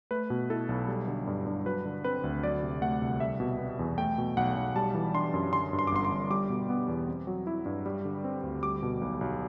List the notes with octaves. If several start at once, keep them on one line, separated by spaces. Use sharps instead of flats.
A3 B4
B2
E4 A4
B1
G3
D3
G2
G2
F#3 B4
D3
C4 B4
D2
F#3 D5
C3
A3 F#5
C2
G3 E5
B2
B3
E2
A3 G5
B2
B1 F#5
B1
G3 A5
E3
D4 C6
F#2
D3 C6
G2
C6
D6
G1 C6
C6
G1
G3 D6
B2
B3
E2
C4
F#3
E4
G2
G3
D3
C4
D2
G3 D6
B2
B1
B1